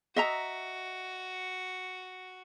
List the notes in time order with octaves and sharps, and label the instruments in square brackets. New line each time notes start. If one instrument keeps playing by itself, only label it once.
[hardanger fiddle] F#4 [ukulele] D#5 E5 A#5